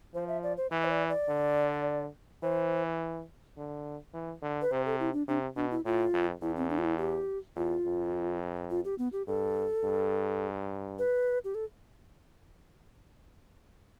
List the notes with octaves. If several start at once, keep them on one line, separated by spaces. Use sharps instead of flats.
F3 C5
E5
D5
C5
E3 E5
C5
D5
D5
D3
E3 C5
D3
E3
D3
B4
C3 C5
A4
E4
D4
C3 D4
B2 D4
E4
A2 F4
F2
E2 E4
C4
D4
F4
E4
G4
E2 F4
F2
F4
G4
B3
G4
G2 A4
G2
B4
G4
A4